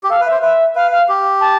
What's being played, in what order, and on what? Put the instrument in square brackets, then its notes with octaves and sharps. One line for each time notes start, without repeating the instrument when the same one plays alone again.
[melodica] G4
[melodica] A4 [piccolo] F5
[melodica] B4
[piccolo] E5
[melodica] C5
[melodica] B4 [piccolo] E5
[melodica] B4 [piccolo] F5
[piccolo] F5
[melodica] G4
[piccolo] A5